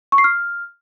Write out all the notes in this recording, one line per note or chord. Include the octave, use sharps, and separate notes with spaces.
C#6
C7
F6